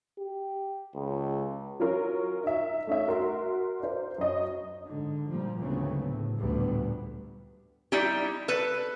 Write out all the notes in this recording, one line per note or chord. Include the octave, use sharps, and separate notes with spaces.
G4
C#2
F#3 C#4 F4 A#4
D#4 E5
A3 C#4 D#4 E5
F#4 A#4 C6
C5 D5
F#2 C#4 D#5
G#2 D3
A#2 F3 G3 A#3
D2 G#2 C#3 F#3 B3 C4
A2
A1 D2 A#2 F3 G3 B3
G3 D#4 E4 G4
A4 B4